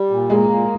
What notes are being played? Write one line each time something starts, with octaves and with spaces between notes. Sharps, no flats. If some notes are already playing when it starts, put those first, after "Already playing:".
Already playing: G3
A#2
G#3 A#3
A#2